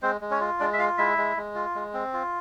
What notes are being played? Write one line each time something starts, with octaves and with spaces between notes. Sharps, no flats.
G#3 C4 C5
G#3
C#4 C#5
F4
G#3 D4 D5
E5
F4 F5
G#3 E4 E5
G#3
G#3
F4
G#3
C4
F4